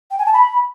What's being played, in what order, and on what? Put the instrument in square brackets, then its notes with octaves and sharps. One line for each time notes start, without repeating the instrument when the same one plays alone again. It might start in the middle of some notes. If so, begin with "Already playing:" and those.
[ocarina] G5
G#5
A5
B5